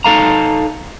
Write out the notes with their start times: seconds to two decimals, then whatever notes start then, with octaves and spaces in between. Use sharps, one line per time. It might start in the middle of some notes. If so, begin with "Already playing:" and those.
0.04 D#4 A4 F5 A#5